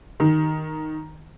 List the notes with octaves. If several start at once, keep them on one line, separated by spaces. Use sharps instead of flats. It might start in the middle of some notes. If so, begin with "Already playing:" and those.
D#3